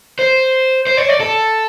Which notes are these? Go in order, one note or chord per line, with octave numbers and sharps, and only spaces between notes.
C5
C5
C#5
D5
A4